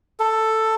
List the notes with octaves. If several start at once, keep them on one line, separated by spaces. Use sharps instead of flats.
A4